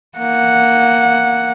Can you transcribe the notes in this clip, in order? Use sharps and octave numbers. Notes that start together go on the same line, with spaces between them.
A#3 F#5